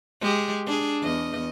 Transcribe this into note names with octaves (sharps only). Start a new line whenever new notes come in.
G#3 G4
D4 G#4
E2 D#5